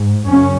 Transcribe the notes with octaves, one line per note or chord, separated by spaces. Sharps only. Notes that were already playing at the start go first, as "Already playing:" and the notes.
Already playing: G#2
F#2 C#3 C#4